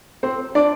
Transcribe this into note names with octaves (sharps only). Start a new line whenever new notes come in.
C4 C5
D4 D5